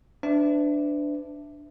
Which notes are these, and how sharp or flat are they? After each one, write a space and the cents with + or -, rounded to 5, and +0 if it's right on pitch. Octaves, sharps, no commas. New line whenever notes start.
D4 +0 B4 +45 E5 +0